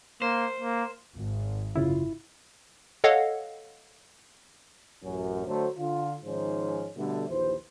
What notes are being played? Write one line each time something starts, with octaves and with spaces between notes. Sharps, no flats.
A#3 C5
A#3
G#1
F#2 C#3 E4 F4
A4 C#5 D#5 F5 F#5
A1 F#2 C#4
D3 F#3 A3 C5
D3 F4
G#2 D#3 F3 C#4 D#4 C5
B2 D3 G3 A3
A#1 D#2 E3 C5